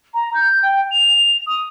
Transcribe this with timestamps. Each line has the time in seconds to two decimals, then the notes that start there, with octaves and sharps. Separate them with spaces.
0.14 A#5
0.34 G6
0.63 G5
0.91 F7
1.46 D#6